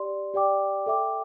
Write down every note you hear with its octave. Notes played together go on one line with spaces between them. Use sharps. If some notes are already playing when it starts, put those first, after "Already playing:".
Already playing: G4 D5 C6
G4 D5 G5 D6
A4 E5 G5 D6